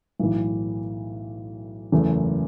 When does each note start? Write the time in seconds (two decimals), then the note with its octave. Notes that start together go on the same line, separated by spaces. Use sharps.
0.19 B1 A2 E3
1.92 F#1 E2 C#3 E3 A3